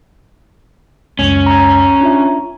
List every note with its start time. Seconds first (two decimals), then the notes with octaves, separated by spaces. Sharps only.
1.19 C#2 F#2 C#4
1.46 A#5
2.01 D4 F4 E5